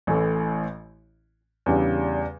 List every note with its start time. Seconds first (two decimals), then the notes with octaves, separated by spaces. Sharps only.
0.07 A1 A2 E3 A3
1.66 E2 C#3 G3 D4